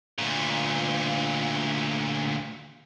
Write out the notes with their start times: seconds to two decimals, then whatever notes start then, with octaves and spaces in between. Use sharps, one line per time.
0.19 D2 A#2